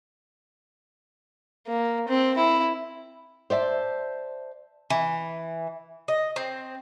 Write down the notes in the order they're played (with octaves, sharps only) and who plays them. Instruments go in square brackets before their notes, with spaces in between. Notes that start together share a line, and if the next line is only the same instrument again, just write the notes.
[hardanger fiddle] A#3
C4
E4
[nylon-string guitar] C5 D5 E5 A5
[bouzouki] E3
D#5
C4